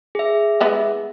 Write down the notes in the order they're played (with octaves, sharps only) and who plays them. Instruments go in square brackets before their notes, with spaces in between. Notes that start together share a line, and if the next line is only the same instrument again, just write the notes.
[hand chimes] G#4 E5
[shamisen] G#3 B3 E4